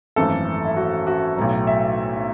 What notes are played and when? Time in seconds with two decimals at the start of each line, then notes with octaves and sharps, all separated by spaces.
0.16 G#1 F#2 E3 A3 A4
0.65 E4
0.76 F#4
1.07 F#4
1.37 B1 A2 F#3
1.67 E5